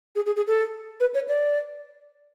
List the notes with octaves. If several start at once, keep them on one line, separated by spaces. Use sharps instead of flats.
G#4
G#4
G#4
A4
B4
C#5
D5